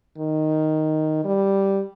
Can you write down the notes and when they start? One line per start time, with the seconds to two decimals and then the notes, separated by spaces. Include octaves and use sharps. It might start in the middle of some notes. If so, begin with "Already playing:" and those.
0.18 D#3
1.25 G3